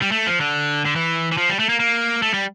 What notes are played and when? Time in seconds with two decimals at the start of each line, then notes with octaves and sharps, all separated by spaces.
0.02 G3
0.12 A3
0.27 F3
0.41 D3
0.86 D3
0.96 E3
1.32 E3
1.38 F3
1.49 G3
1.59 A3
1.69 A#3
1.80 A#3
2.22 A3
2.34 G3